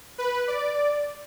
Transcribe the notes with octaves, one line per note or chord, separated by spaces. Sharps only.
B4
D5